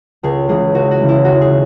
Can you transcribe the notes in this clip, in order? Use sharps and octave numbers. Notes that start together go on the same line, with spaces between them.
C#2 G#4
C#3 E3 G#3 G#4
C#2 F#4
F#4
C#3 E3 G#3
E4
D#2 F#4
G#4
C#3